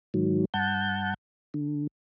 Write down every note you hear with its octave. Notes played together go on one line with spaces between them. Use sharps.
G#2 D#3 F#3
G2 F#5 A5 G6
D3